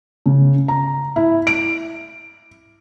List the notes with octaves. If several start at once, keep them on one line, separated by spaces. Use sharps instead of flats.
C#3
A#5
E4
D7